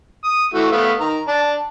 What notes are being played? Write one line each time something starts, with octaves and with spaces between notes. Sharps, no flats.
D#6
E3 A3 F#4
A3 B3 F5
D#3 A#5
D4 A5